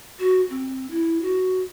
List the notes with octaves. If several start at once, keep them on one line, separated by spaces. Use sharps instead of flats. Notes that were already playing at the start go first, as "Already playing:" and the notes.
F#4
C4
E4
F#4